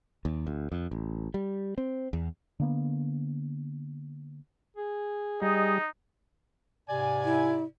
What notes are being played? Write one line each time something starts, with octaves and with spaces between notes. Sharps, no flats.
D#2
D2
F2
A1
G3
C4
E2
D3 A#3 B3
G#4
G3 D#4 G#4 D#5
G#2 C3 D5 G#5
E4